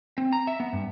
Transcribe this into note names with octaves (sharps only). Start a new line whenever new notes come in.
C4
A#5
E5
B3
G2